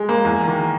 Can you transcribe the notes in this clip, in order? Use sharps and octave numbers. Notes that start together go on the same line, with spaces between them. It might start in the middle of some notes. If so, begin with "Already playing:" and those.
Already playing: G#3
A#3
E2
D#3